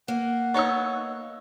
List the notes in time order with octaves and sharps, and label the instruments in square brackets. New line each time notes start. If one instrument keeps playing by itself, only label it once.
[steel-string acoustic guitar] A#3 [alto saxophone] F#5
[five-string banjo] B3 D#4 C#5 [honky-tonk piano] C#6 E6